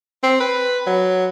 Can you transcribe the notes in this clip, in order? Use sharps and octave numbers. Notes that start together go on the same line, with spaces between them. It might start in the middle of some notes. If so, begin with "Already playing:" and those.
C4
B4
F#3